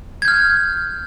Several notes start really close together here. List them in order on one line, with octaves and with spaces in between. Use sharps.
G#6 G6 F6